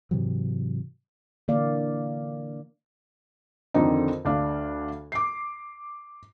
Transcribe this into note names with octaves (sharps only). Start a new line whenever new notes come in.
G#2 C3 E3 F#3
D3 E3 A#3 D5 F5
F2 D3 D#3 C4 D4 D#4
D2 D4 F5
D6 C7